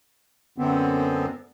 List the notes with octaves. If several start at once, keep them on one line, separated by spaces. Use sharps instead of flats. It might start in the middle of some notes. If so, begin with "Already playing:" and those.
F#2 D3 B3 C4